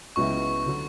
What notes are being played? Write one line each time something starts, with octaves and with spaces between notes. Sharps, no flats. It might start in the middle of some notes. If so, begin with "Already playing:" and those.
C#2 C#3 F#3 B3 E4 C#6
D3 F#3